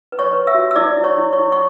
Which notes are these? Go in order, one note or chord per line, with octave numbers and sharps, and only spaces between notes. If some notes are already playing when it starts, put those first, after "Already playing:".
B4
C#5 C#6
B4
E5 E6
F#4
E6
E4 D5 D6
E4
C#5 C#6
E4
C#5 C#6
E4
C#6